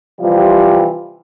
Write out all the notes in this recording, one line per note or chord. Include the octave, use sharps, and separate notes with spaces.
C3 E3 F3 G3 F4